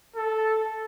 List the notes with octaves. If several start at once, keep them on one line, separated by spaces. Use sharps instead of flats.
A4